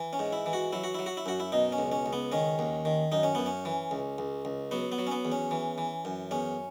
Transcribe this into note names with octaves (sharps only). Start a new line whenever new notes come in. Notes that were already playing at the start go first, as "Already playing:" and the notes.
Already playing: E3
C#4
G#2
E4
E3
F#4
F#3 E4
F#4
F#3 E4
F#4
E4
F#2 F#4
E4
B2 D#4
C#4
C#2
C#4
C#2
B3
D#3 C#4
D#2
D#3
F#2 D#4
C#4
F#2 B3
C#4
E3
C#2
C#2
C#2
F#3 B3
B3
F#3
C#4
B3
E2
C#4
E3
E3
F#2
E2 C#4